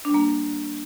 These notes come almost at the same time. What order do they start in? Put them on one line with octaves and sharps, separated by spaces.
D4 G3 A#3